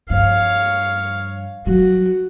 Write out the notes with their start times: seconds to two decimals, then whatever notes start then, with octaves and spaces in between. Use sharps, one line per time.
0.10 G2 F3 C#5 F5
1.66 F#3 G3 F#4